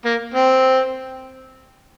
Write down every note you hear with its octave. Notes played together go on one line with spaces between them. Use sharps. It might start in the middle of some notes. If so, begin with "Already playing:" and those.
A#3
C4